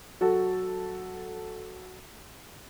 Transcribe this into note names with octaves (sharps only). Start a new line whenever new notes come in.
F#3 F#4 A4